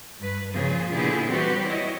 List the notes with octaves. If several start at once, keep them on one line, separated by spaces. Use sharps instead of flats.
G2 B4
A#2 C#3 F3 F4 G#4
A#2 D3 B3 E4 G4 G#4
E3 G3 C4 F#4 G4 B4
E4 C#5 D#5